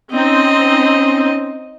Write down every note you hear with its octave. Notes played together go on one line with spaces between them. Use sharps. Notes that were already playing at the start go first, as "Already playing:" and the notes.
C4 C#4 D#4 C5 D#5